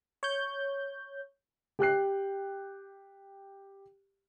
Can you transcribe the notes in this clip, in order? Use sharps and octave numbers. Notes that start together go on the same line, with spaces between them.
C#5 G6
G4 G5 F#6 C7